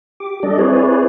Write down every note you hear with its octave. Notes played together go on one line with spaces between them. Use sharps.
G4 D6
G3 D4 A4 D5 D#5
C4 E4 G#4 B4 C#5 D5